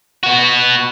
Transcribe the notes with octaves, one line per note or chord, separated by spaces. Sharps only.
B3 F#4